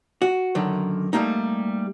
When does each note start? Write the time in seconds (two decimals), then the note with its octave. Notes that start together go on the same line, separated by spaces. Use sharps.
0.22 F#4
0.55 F#2 D3 D#3
1.13 G3 A3 A#3 D#4